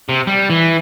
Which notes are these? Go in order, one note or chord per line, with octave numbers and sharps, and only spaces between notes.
C3
G3
E3